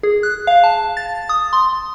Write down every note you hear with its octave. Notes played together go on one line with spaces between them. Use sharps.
G#4
F#6
F5
A5
A6
D#6
C6